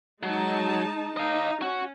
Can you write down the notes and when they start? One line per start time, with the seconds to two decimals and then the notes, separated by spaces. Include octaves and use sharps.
0.23 F#3 G#3 D#4 A5
1.17 D#4 D#5 F5
1.62 C#4 F#4